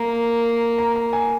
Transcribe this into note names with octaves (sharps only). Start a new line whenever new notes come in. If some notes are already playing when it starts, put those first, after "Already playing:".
Already playing: A#3 A#5
A#5
A#5
G#5